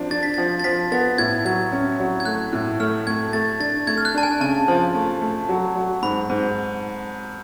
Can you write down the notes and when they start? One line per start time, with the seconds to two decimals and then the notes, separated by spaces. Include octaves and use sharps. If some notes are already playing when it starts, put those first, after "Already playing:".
Already playing: F3 D4
0.11 D4 A6
0.23 B6
0.34 F3 A6
0.60 A6
0.64 F3 B6
0.92 B3 A6
1.18 A2 G#6
1.45 F#3 G#6
1.72 C#4
2.00 F#3
2.20 G#6
2.25 A3 F#6
2.53 A2
2.80 A3 F6
3.07 A3 G#6
3.33 A3 A6
3.60 D4 A6
3.87 A3 G#6
3.98 F6
4.05 F#6
4.15 D4 A5
4.23 G#5
4.40 C#3 A5
4.68 F3
4.95 A3
5.21 A3
5.49 F#3
5.75 F#3
6.02 G#2 B5
6.30 G#2